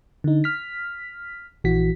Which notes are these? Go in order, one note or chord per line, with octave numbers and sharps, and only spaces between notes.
D3 D#4
F6 B6
A#1 E3 F#4 B6